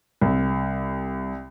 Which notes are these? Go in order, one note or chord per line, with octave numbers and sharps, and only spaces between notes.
C2